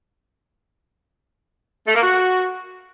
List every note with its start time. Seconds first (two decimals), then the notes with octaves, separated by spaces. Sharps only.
1.87 A3
1.95 A#3
2.02 F#4